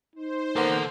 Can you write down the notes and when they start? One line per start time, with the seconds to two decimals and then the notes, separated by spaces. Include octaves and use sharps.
0.16 D#4 C5
0.56 A#3 B3 A4 F#5